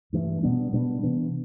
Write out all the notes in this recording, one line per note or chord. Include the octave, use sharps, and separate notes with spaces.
G2 E3 A3
B2 G3 B3 D4
B2 G3 B3 D4
C3 E3 B3 D4